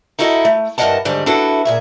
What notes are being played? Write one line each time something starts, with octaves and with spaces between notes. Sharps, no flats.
D#4 E4 F#4 A4 D5 D#5
A3
G2 E3 A#4 D#5 F#5 A5
G#2 D3 D#3 G3
D4 E4 F#4 A4 B4
A#2 G#4 E5